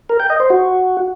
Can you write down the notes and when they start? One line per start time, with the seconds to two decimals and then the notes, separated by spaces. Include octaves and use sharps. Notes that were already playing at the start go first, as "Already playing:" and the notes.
0.09 A#4
0.20 G5
0.30 D#5
0.40 C5
0.50 F#4